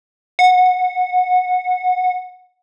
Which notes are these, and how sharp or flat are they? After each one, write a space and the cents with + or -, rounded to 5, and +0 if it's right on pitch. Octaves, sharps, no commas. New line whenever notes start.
F#5 -20